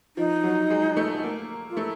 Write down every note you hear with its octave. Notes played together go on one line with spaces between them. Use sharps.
F3 D#4
F#3
G#3
A3
A#3
F4
A3 E4